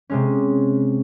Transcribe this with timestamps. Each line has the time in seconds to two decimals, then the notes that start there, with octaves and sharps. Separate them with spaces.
0.10 C3 G#3 C#4